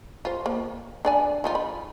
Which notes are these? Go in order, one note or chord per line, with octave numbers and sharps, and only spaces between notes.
F4 C5
A#3
D4 D5 G#5
F3 D#4 F4
B5